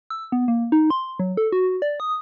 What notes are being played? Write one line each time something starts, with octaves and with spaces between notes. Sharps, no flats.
E6
B3
A#3
D#4
C6
F#3
A4
F#4
D5
D#6